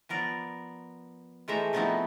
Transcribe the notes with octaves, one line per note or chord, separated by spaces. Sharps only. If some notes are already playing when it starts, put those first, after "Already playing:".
F3 B3 A#4 D5
E3 G#3 A3 C5 E5 A#5
F3 A3 B3 C4 D#4 E4